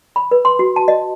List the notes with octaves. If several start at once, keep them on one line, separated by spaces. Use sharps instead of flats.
B5
B4
C6
F#4
A5
D#5